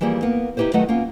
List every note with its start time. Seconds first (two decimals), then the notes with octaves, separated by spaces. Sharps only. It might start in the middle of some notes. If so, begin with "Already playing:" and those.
0.01 E3 F3 G3 A#3 G#4
0.22 A#3 B3 A#4
0.57 D#4 E4 G4 B4 C5
0.73 D#3 F#3 A3 B4 D#5 F#5
0.89 A#3 B3 C#4 F4